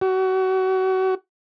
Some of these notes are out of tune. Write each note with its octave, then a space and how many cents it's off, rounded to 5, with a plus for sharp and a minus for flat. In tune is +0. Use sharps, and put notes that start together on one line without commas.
F#4 +30